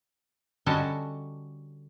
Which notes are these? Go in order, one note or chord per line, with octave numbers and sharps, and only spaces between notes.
D3 G3 C#4 F#4 D#5 A5